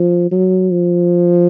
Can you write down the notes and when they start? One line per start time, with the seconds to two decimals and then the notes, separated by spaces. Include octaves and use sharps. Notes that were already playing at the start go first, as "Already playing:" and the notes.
Already playing: F3
0.31 F#3
0.71 F3